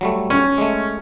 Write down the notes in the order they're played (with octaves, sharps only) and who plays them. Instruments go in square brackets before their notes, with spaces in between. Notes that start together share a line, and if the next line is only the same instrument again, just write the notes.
[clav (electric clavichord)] F#3 G3 A3
[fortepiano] C#4
[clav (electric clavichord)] G#3 A3